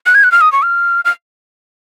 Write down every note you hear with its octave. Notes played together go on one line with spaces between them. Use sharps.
F#6
G#6
F#6
F6
D#6
C#6
F6
F6